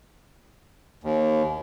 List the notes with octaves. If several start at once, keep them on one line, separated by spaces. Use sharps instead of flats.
D#2